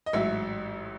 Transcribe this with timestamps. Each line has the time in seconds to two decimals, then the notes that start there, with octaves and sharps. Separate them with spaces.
0.06 D#5
0.13 A1 G#2 F#3 E5